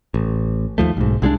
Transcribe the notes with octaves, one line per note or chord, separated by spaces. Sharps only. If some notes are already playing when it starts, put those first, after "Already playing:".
A1
D#2 F3 A3
B1 G#2
C2 G#3 C4 D4